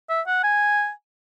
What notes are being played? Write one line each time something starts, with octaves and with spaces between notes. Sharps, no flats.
E5
F#5
G#5